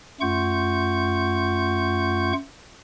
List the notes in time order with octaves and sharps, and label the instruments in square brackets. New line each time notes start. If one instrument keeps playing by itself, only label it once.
[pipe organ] F#2 A3 F4 F#5 C#6 G6